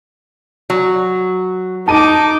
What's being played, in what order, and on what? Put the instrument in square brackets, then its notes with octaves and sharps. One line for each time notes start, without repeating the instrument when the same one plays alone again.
[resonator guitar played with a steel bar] F#3
[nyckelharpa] D#4 D6 [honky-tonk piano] A5 D#7